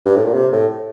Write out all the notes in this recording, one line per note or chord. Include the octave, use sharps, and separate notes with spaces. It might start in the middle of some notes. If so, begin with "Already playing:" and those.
G2
A2
A#2
C3
A2